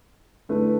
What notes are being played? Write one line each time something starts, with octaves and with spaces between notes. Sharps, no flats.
D3 A3 E4 B4